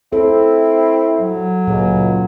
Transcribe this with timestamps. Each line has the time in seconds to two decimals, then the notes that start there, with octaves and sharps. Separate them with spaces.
0.13 C4 E4 A4
1.21 F#3
1.67 C#2 A#2